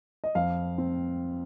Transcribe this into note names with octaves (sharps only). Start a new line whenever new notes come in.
D#5
F2 F5
C4